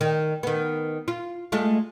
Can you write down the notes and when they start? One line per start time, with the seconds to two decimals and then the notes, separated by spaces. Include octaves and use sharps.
0.01 D#3
0.43 D#3 B3
1.08 F4
1.52 G#3 A3 F4